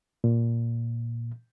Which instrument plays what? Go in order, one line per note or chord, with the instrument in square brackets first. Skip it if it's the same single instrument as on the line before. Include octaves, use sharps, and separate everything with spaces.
[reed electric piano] A#2